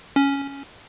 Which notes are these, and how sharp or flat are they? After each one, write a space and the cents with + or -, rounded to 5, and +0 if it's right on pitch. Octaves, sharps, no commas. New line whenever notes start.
C#4 +5